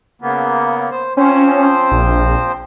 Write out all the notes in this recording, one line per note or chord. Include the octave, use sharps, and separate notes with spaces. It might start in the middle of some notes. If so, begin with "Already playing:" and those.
C#3 A#3 B3
C5
F3 C4 C#4 C5
A#1